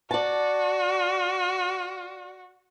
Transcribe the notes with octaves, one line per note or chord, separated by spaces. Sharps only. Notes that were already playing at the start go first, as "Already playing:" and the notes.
F#4 D5 A5